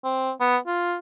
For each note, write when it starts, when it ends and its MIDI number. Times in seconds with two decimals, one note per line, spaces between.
0.04 0.31 60
0.40 0.57 59
0.66 0.97 65